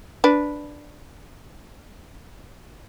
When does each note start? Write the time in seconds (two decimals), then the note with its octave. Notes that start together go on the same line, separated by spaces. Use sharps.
0.24 D4 B4